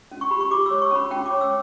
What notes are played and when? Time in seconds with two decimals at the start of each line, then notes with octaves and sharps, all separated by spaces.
0.12 C#4
0.21 C#6
0.31 G4 B5
0.41 C#6
0.51 G4 D6
0.66 E6
0.71 C#5
0.82 C#6
0.91 C#4 B5
1.11 C#4 G5
1.26 D6
1.31 C#5
1.41 E6